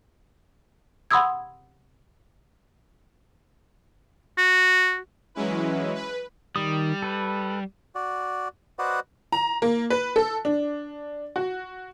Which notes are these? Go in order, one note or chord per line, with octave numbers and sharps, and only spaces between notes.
F#5 B5 C6 D#6 E6 G#6
F#4
E3 F#3 G#3 C#4 E4 B4
B4
D#3 G3 D#6
A4 B4
F#4 D5
F#4 B4 C5 D5 D#5 F#5
A#5
A#3
B4
A4
D4
F#4